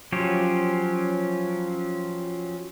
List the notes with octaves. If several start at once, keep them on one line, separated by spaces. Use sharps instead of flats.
F3 F#3 C#4 F4 G4